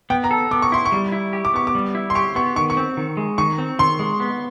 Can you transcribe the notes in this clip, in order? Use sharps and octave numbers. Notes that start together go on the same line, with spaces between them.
B3 G5
A#5
A4
B3 D6
C#6
E4 C6
C#6
G3
E4
G4
D6
B3 C#6
D6
G3
E4
C6
G4 C#6
B3 C#6
D#3 C#6
C#6
C4
D#3
G#3
D#3 C#6
C4
D#3 C6
G#3
B3